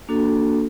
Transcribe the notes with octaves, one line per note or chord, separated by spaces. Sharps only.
A#3 D4 F#4 A4